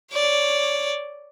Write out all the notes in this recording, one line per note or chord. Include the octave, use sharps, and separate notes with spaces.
C#5 D5